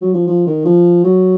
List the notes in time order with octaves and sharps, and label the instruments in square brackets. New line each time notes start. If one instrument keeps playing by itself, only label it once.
[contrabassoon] F#3
F3
F3
D#3
F3
F#3